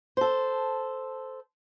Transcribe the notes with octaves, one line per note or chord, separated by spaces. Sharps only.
A4 C5